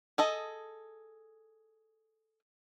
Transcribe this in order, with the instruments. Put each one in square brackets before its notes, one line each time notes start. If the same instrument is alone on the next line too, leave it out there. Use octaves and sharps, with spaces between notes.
[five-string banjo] G#4 A4 D#5